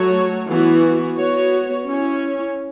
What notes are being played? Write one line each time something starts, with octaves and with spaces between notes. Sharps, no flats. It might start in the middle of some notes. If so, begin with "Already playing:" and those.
Already playing: F#3 A3 F#4 C#5
E3 B3 F#4
B3 F#4 C#5
C#4 E4 C#5